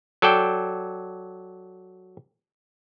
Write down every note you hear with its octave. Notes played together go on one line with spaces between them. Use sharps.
F#3 A4 D5 G5